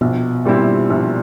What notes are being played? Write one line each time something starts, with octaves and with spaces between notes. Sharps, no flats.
A#1 B2
A#2 G3 C4 E4
A#1